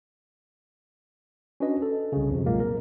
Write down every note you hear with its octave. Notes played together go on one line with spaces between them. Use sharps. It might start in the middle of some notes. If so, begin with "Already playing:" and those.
C#4 D4 F#4 B4 D#5
A4
C2 C#3
F2 C3
B1 A#2 F#3 G#3 A#3
A#4